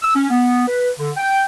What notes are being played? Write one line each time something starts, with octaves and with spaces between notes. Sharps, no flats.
E6
C#4
B3
B4
D3
G5